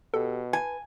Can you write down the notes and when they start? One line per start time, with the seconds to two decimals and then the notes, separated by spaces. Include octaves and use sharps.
0.14 B2 G4 A4
0.53 B4 G#5